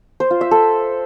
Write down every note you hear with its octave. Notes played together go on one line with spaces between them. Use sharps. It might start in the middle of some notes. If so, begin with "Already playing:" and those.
C5
F4
E5
A4